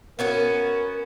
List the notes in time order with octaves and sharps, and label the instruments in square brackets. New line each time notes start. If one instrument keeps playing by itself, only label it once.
[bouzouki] B3 C#4 F#4 [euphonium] A#4